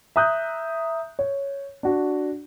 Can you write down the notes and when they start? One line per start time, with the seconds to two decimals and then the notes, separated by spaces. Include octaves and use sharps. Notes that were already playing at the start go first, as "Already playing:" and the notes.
0.16 E5 A#5 D#6 F#6 G6
1.19 C#5
1.83 D4 F#4